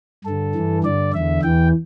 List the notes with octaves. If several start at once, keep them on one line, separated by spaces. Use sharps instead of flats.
G2 D3 A4
G2 E3
G2 D3 D5
E2 D3 E5
E2 E3 G5